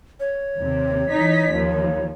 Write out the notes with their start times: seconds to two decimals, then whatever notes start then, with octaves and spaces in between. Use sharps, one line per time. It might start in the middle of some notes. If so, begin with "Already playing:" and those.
0.20 C#5
0.57 D#2 C3
1.09 E3 D#4 B6
1.52 D#2 F3